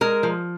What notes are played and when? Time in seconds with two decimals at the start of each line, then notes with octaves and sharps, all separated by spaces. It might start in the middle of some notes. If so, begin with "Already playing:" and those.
0.01 G#3 A#4
0.23 F3